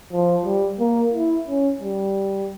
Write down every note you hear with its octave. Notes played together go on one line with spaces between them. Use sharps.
F3
G3
A#3
E4
C#4
G3